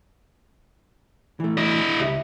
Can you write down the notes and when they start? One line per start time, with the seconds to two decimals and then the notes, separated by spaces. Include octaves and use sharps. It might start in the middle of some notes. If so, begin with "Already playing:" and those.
1.40 E3 A3
1.58 E4 D#5
2.00 C#2 G4 E5